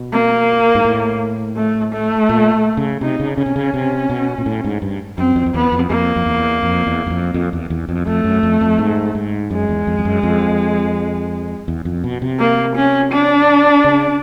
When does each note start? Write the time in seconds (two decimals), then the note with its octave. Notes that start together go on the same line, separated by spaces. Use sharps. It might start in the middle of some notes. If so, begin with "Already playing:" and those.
Already playing: B2
0.12 A#3
0.75 G#2
0.85 A2
1.57 A3
1.93 A3
2.29 A#2
2.77 C#3
3.01 C3 D#4
3.20 C#3
3.37 C#3 C#4
3.46 C3
3.56 C#3
3.74 C3
4.10 B2
4.38 A#2
4.46 A2
4.64 G#2
4.82 G2
5.18 F#2 C4
5.36 F2
5.46 F2
5.54 E2 B3
5.72 F2
5.90 F2 A#3
6.16 F2
6.26 E2
6.63 F2
6.87 E2
7.07 F#2
7.10 F2
7.34 F2
7.53 E2
7.70 E2
7.89 F2
8.06 F2 A3
8.24 F#2
8.43 F2
8.61 F2
8.79 G#2
9.15 G#2
9.51 F#2 G#3
9.69 E2
9.87 F2
9.99 F2
10.05 F#2
10.23 F2
11.68 E2
11.85 F2
12.04 B2
12.22 C3
12.39 A#3
12.76 C#4
13.12 D4
13.84 C#3